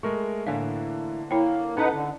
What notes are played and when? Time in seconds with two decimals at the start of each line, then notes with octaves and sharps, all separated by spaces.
0.03 G#3 A3 A#4 C#6
0.47 A2 D3 E3 A#3 D4 F5 G#5
1.31 A#3 E4 C#5 G5
1.77 C#4 D#4 A4 B4 F#5 A5
1.93 D3